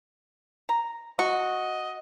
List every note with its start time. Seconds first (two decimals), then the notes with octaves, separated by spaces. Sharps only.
0.69 A#5
1.19 F#4 D#5 C#6